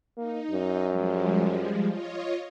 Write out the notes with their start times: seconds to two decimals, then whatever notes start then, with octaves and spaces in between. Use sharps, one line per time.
0.17 A#3 D#4
0.51 F#2
0.89 F3 G3 G#3
1.87 F4 C#5 D#5